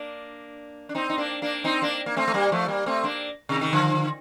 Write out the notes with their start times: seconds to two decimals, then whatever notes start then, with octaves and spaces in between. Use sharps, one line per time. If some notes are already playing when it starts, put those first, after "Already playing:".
Already playing: A#3 D4
0.89 D4
0.95 C4 D#4
1.10 D#4
1.18 A#3 D4
1.42 A#3 D4
1.64 C4 D#4
1.82 A#3 D4
2.06 A#3
2.16 A3 C4
2.28 A3
2.34 G3 A#3
2.52 F3 A3
2.68 G3 A#3
2.86 A3 C4
3.03 A#3 D4
3.49 C3 D#3
3.61 D#3
3.73 D3 F3